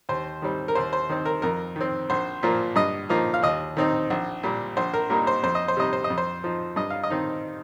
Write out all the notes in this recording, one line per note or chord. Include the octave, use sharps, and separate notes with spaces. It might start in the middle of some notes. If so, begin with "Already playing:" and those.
D#2 C5
D#3 G3 C4
A#4
D#2 C5
C5
D#3 C4
A#4
F2 A#4
D#3 C4
A#1 C5
A#2 F3 A#3
G2 D#5
F3 A#3 D#4
F5
D#2 D#5
D#3 C4 D#4
A#1
A#2 G3
A#1 C5
A#4
A#2 G3 A#3 D#4 A#4
C5
F2 C5
D#5
C5
C3 G3 D#4 D#5
C5
D#5
F2
C5
F3 D#4
G2 D#5
F5
D#5
D#3 C4 D#4